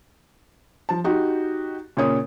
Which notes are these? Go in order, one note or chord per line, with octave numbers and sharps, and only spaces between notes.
F3 A5
D#4 F#4 G4
A#2 C#3 C#5 D#6